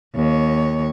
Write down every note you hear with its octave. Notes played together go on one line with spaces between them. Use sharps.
D#2 C#5